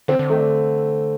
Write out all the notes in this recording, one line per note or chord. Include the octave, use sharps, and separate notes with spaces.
D3 C4
D3
D#3 A3
D3